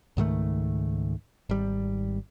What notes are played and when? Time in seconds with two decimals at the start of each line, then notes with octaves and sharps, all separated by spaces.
0.17 C#2 G#2 D#3 A3
1.49 G#1 G3